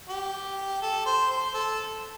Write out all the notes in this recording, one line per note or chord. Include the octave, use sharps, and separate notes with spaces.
G4
A4
C5
C5
A4